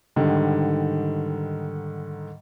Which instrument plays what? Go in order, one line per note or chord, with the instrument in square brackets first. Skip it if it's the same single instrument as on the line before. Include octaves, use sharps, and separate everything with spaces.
[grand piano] G#2 D3 D#3 G3